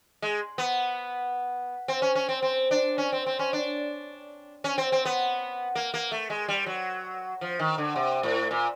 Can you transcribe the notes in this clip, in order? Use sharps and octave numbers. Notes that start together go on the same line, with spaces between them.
G#3
B3
C4
C#4
C#4
C4
C4
D4
C#4
C4
C4
C#4
D4
C#4
C4
C4
B3
A#3
A#3
A3
G#3
G3
F#3
F3
D#3
D3
C3
A2
A#2